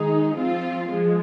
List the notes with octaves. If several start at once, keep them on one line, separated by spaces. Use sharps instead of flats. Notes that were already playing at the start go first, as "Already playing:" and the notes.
Already playing: D#3 G#3 D#4 G#4
F3 C4 F4
F3 G#3